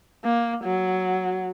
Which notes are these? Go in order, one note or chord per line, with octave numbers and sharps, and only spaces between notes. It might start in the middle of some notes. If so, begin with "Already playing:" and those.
A#3
F#3